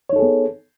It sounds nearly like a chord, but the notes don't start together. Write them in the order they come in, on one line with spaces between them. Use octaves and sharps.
C#5 D#4 A4 G#4 B3